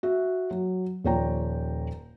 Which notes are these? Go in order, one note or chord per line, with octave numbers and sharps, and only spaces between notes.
F#4 E5
F#3
D#1 F3 C#5 D5 G5 A#5